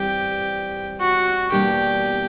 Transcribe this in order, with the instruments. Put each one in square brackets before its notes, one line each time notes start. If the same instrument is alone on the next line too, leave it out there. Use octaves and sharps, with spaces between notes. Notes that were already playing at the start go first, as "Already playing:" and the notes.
Already playing: [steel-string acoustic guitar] G2 E3 G3 C4 [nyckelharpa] G4
[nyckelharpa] F#4
[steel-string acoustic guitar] E2 B2 G3 A#3 D4 [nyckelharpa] G4